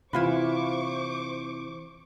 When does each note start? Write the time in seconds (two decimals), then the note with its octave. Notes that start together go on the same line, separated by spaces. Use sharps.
0.13 C3 E3 E4 F4 B4 C5 C#6 D6